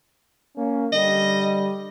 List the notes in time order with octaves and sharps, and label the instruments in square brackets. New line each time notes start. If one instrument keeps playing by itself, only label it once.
[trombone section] A#3 C#4
[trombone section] D3 G3 [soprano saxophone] D#5